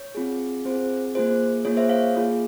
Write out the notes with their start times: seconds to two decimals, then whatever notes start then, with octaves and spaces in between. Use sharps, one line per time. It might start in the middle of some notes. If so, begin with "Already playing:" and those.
Already playing: C#5
0.15 C4 F4 G#4
0.65 C4 F4 G#4 C5
1.15 A#3 F4 G#4 C5
1.64 A#3 F4 G#4 C#5
1.77 C5 E5
1.89 C#5 F5
2.15 A#3 F4 G#4